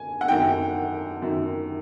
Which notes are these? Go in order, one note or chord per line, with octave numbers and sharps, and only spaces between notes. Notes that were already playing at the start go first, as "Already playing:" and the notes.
Already playing: G#5
F#5
F#2 D#3 G5
F#2 D#3